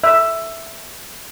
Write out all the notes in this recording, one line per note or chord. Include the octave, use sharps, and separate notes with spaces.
E5